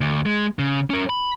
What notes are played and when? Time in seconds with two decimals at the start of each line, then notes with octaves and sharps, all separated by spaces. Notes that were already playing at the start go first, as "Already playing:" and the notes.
0.01 D2
0.26 G#3
0.59 C#3
0.90 C#4 A#4
1.10 B5